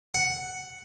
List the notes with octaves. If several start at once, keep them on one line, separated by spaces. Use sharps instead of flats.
F#5